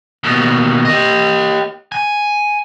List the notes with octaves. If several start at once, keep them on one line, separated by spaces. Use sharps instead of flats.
D#2 B2
G4 D#5
G#5